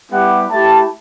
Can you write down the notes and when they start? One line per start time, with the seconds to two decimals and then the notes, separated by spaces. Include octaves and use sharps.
0.11 G3 B3 E4 G4 F#5
0.50 A3 E4 G4 A5